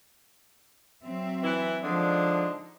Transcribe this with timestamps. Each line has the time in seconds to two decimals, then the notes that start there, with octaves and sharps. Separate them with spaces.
1.03 F#3 C4 E5
1.43 E3 E4
1.83 D3 F3 G#3 D4 D#4